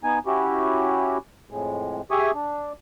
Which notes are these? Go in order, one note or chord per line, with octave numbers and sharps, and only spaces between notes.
B3 D#4 G#5
C#4 E4 F#4 G4
F2 A2 G#3
G4 G#4 E5 G#5 C#6 D#6
D4